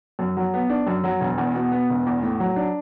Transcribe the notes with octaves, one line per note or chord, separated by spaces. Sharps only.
F#2
F#3
B3
D4
F#2
F#3
E1
E2
B2
B3
E1
E2
A2
F#3
D4